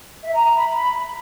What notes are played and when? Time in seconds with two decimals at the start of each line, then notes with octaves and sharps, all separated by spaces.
0.23 E5
0.33 A#5
0.44 A#5
0.54 B5